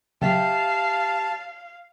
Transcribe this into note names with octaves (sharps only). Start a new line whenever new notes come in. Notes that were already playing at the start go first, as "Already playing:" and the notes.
C#3 F#3 G4 E5 F5 G5 A5 B6